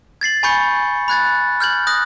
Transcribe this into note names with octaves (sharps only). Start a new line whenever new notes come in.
G#6 A6 C7 F#7
G#5 B5 C#6 G6 C#7
B5 F#6 G#6 A6
F6 G6 G#6 F#7
D#6 F#6 A#6 F#7